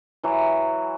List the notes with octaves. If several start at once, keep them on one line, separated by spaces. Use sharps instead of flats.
E3 F#3